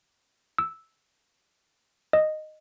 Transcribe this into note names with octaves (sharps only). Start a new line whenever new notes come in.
E6
D#5